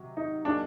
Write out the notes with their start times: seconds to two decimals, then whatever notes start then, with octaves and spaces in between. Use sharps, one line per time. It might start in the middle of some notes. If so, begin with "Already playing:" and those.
Already playing: C3 D#3 F#3
0.17 D#4
0.45 F#3 A#3 D4 D#4 G#4